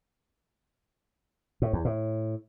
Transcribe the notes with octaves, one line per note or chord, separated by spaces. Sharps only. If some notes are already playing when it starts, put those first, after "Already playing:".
A2
E2
A2